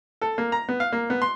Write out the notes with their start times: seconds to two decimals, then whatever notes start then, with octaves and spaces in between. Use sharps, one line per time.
0.22 A4
0.38 A#3
0.52 A#5
0.69 B3
0.80 F5
0.92 A#3
1.10 B3
1.22 C6